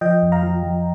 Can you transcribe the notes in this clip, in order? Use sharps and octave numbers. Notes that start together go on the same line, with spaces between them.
F3 D#5 G5
F2
F5 A#5
F3
F3